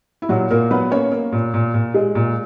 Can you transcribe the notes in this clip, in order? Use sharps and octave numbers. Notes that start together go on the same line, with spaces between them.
E4
A#2 F#3 F#4
A#2 A#3 A#4
F#3 B3 B4
A#3 C#4 C#5
A#3
A#2
A#2
A#2
G#3
A#2